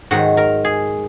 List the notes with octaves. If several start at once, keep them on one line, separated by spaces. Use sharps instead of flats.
G#2 D#3 F#3 F#4
A#4
G#4